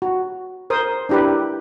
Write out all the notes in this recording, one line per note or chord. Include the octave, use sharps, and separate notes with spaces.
F#4
A#4 C5 D#6
D4 E4 G4 A#4 B4